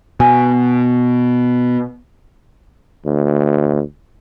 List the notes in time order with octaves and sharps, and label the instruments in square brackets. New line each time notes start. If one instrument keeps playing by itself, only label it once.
[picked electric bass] B2 [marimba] G#5
[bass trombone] D2